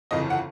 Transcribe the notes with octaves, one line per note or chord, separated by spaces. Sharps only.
G1 F2 C#3 E3 D#5
F#5